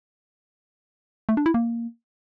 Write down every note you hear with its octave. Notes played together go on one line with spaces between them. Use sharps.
A3
D4
E4
A#3